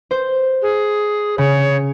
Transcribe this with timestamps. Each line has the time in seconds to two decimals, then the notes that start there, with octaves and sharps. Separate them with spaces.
0.11 C5
0.62 G#4
1.38 C#3 C#5